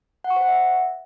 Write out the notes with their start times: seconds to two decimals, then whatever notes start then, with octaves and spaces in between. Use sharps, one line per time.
0.24 F#5
0.30 C#6
0.36 C5
0.42 F#5
0.48 E5